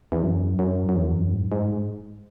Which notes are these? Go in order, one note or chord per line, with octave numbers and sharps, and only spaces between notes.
E2
F#2
F#2
F#2
E2
F#2
G#2
G#2